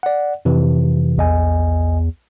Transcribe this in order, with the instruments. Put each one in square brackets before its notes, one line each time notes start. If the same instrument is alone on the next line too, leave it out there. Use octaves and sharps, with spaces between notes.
[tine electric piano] D5 F#5
F2 C3 E3
[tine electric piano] A#1 D#5 G#5 [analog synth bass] E2